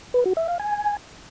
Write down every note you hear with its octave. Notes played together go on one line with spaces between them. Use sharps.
B4
F#4
E5
F5
G#5